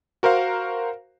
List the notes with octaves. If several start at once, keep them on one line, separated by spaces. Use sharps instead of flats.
F#4 A#4 C5 F5